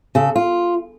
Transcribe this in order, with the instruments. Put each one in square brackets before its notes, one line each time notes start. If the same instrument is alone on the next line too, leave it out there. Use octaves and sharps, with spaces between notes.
[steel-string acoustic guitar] C#3 A4
F4